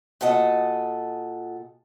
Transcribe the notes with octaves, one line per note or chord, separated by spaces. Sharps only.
A#2 F#4 A4 D#5